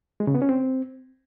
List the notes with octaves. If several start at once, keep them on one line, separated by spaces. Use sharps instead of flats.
G#3
C#3
B3
C#4
C4